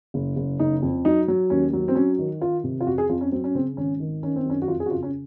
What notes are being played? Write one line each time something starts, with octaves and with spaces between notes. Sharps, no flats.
F#1
F#1
F#1 D#4
F2
F#3 D#4
F#3
D#2 C#4
F#3
C4
F#3 C#4
D#3
D#3 F4
C3
F4
F2 F#4
G#4
F2 F4
C#4
F#3 C4
C#4
C#3 C4
G#1 C#4
D#3
D#3 C#4
C4
F#2 C#4
F#4
F2 F4
G#4
F#4
C#3 F4
C#4